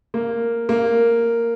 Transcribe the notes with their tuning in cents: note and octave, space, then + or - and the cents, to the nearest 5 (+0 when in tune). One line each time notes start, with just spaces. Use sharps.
A#3 -5
A#3 -5